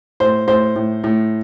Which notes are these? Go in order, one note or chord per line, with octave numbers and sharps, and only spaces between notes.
A2 C5
A2 C5
A2
A2